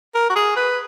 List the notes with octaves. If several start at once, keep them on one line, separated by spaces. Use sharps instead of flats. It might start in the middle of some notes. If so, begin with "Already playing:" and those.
A#4
F#4
G#4
B4